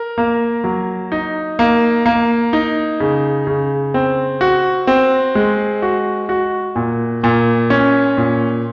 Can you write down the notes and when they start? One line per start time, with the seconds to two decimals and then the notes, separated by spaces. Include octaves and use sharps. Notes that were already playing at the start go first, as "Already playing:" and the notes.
Already playing: A#4
0.18 A#3
0.64 F#3
1.12 D#4
1.59 A#3
2.06 A#3
2.53 D#4
3.00 C#3
3.47 C#3
3.94 C4
4.41 F#4
4.87 C4
5.35 G#3
5.82 F#4
6.29 F#4
6.76 A#2
7.24 A#2
7.70 C#4
8.17 A#2